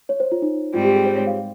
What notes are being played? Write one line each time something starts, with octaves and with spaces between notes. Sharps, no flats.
C#5
C5
F4
D#4
G#2 G3 C4 F4
G4
G#4
C5
C#5
F5